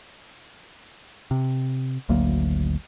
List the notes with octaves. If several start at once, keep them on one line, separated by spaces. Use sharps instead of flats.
C3
G#1 D2 F#3 A#3